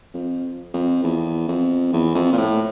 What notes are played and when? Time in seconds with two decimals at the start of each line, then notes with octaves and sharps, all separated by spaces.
0.14 F2
0.74 F2
1.03 E2
1.48 F2
1.93 E2
2.15 F2
2.33 A#2
2.37 A2